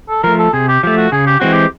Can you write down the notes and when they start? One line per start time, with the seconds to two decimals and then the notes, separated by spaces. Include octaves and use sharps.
0.09 A4
0.23 F3 A3 A#4
0.39 A4
0.53 C3 G#4
0.68 G4
0.83 F3 A3 G4
0.97 F#4
1.12 C#3 G#4
1.26 G4
1.40 E3 G#3 C4 F#4
1.53 G4